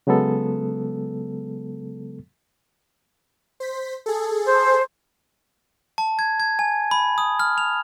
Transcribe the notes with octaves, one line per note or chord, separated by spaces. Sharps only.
C#3 F#3 G#3 B3 A4
C5 B6
G#4 A4
C5
A5
G#6
G#6
G#5
B5
D#6
F6
F7